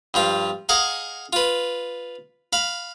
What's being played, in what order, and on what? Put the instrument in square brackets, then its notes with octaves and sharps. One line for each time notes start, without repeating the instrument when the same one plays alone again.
[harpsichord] G2 F3 F4
G#4 D#5 F5 F#5 G#5 A#5
F4 B4
F5 B5